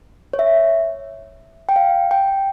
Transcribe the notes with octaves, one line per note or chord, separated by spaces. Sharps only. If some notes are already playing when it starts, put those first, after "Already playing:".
C#5
E5
G5
F5
G5